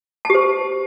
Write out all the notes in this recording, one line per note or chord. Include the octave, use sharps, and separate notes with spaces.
G4 C5 A5